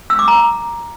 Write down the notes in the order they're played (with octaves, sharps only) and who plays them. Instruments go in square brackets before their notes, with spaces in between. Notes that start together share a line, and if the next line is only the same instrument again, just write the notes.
[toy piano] E6
D6
A#5